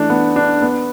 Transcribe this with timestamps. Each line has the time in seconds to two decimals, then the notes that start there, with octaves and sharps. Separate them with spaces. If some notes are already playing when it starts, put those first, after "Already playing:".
Already playing: E3 A3 D4
0.10 B3
0.36 D4
0.62 B3